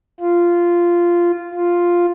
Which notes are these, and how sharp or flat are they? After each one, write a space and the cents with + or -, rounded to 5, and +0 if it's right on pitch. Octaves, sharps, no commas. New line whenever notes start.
F4 -10
F4 +0